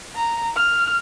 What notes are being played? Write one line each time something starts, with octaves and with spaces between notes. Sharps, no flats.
A#5
F6